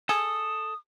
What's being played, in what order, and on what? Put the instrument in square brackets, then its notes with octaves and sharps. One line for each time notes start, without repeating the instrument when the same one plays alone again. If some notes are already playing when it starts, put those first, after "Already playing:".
[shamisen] G#4 [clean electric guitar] A4 [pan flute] D#6